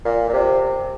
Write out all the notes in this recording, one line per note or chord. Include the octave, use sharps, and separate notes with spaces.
A#2
A#2
C3